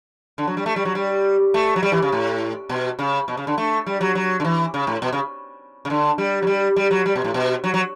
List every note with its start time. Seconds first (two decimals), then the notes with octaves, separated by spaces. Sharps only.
0.38 D3
0.47 F#3
0.57 G3
0.66 A3
0.76 G3
0.85 F#3
0.95 G3
1.54 A3
1.76 F#3
1.83 G3
1.92 E3
2.02 C#3
2.12 A2
2.69 B2
2.99 C#3
3.28 B2
3.37 C#3
3.47 D3
3.58 A3
3.87 G3
4.01 F#3
4.15 F#3
4.40 D3
4.44 E3
4.74 C#3
4.87 A2
5.02 B2
5.13 C#3
5.85 C#3
5.90 D3
6.18 G3
6.42 F#3
6.47 G3
6.76 G3
6.91 F#3
7.06 G3
7.15 B2
7.24 A2
7.34 B2
7.64 F#3
7.74 F#3